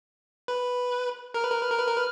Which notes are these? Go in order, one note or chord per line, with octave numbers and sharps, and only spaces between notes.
B4
A#4 F6
B4
A#4
B4
A#4
B4
A#4
B4